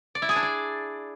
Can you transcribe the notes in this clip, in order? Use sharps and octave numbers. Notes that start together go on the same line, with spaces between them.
D5
E4
G#4
D4
D5